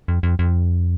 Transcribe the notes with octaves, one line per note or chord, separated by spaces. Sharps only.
F2
F2
F2